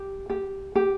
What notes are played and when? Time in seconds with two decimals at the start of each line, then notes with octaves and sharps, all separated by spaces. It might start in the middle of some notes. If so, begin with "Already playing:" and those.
Already playing: G4
0.30 G4
0.75 G4